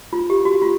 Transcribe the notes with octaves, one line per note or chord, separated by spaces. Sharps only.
F4
G4
F#4
F4